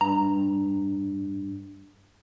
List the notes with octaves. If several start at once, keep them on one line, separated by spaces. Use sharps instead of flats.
G2 A#5